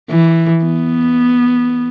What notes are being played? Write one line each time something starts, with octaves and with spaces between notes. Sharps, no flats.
E3
B3